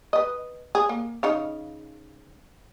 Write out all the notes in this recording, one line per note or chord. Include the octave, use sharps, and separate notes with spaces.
B4 D#5
G#4
A#3
C#3 D#4 F5